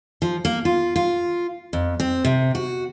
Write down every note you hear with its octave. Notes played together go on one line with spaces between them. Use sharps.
F3
A#3
F4
F4
F2
C4
C3
F#4